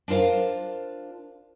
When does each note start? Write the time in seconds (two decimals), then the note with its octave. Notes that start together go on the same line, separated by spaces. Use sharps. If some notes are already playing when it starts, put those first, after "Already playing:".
0.08 D4 F4 A#4 C5 F5